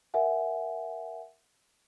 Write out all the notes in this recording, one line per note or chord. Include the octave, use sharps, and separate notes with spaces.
A#4 E5 F#5 G#5